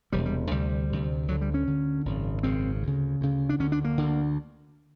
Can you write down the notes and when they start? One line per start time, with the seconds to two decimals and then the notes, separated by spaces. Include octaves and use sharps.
0.12 E1 E2 C3 G3
0.26 G3
0.51 D2 C3 G3
0.90 D2 C3
1.28 D2 D3 F#3
1.41 G3
1.54 C#4
1.67 D2 D3
2.05 G#1 F#2 C#3
2.43 G#1 F#2 C#3 C4
2.83 D2 C#3
3.21 D2 C#3
3.49 D4
3.59 D2 D3 C#4
3.72 D4
3.84 A#3
3.98 D2 D3